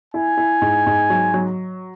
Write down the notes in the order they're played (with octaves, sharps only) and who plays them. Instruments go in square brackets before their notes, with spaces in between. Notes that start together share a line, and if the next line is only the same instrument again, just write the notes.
[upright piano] E4 [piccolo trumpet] G#5
[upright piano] E4
G#2
G#2
F#3
F#3